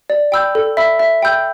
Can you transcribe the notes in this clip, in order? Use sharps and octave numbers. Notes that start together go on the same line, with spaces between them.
D5
G5 B5 E6 G6
A4
E5 B5 E6
E5
G5 B5 E6 G6